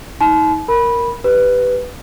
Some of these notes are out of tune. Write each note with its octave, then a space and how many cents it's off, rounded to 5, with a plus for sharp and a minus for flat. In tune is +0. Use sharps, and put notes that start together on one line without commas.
D#4 +35 A5 -40 C6 -35
A#4 +0 B5 -10
G4 +0 B4 +5